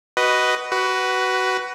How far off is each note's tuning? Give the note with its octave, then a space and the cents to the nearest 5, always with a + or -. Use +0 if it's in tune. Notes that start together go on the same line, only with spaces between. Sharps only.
F#4 +20 B4 +0 D#5 +0
F#4 +20 B4 +0